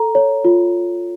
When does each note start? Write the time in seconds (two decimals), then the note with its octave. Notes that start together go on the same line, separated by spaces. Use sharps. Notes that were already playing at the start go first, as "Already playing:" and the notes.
Already playing: A4 A#5
0.15 C#5
0.45 F4